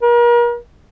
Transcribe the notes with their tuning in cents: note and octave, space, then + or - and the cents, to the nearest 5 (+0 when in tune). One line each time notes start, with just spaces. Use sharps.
A#4 +40